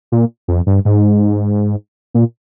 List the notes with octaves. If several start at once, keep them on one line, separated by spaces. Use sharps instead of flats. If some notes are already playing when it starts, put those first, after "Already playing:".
A#2
F2
G2
G#2
A#2